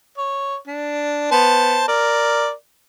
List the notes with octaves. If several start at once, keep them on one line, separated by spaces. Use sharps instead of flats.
C#5
D4
B3 C5 A5
A#4 D5